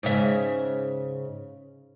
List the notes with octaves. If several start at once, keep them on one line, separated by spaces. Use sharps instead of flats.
G#2 C#3 E5